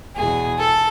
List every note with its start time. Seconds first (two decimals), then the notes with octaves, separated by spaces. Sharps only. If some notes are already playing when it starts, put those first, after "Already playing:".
0.17 E2 B2 G#4
0.59 A4